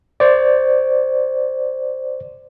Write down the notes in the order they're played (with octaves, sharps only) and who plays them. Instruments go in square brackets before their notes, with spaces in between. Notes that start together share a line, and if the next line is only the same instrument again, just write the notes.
[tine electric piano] C5 D5